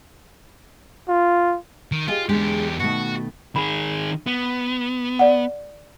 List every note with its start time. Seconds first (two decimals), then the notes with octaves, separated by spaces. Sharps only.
1.09 F4
1.92 D#3
2.08 F4 G4 G#4 D#5
2.29 E2 G#3 D4 G4 G#4
2.80 B2 D#3 A3 F#4
3.56 D#3 G#4 B5
4.27 B3
5.19 D5 F#5